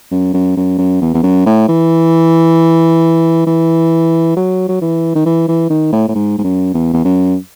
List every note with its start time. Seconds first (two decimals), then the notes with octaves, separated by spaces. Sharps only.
0.11 F#2
0.33 F#2
0.57 F#2
0.78 F#2
1.02 E2
1.14 E2
1.23 F#2
1.46 A2
1.68 E3
3.47 E3
4.36 F#3
4.68 F#3
4.81 E3
5.15 D#3
5.26 E3
5.48 E3
5.70 D#3
5.92 A2
6.08 A2
6.15 G#2
6.38 G#2
6.44 F#2
6.74 E2
6.93 E2
7.05 F#2